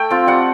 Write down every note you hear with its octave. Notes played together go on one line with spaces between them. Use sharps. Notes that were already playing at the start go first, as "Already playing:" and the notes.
Already playing: A3 G5
C4 F4
G3 F#5